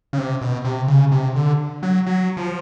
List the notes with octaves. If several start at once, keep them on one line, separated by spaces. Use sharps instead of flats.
C#3
C3
B2
C3
C#3
C3
D3
F#3
F#3
F3